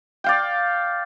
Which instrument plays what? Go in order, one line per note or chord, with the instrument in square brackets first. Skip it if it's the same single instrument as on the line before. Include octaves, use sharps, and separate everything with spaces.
[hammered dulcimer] D5 F5 G5